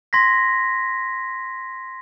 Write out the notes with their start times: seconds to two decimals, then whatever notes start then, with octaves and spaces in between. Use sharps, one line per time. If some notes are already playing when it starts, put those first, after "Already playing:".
0.13 C6 G#6 A#6 B6